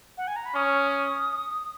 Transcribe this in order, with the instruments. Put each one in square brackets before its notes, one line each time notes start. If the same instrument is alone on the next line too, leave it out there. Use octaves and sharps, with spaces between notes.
[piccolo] F#5
G#5
A#5
B5
[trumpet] C#4 [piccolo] D#6